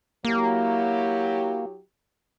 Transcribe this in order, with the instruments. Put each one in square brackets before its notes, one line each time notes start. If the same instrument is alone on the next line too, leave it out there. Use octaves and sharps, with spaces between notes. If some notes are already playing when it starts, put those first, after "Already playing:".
[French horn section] F#3 E4 G4 [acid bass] A#3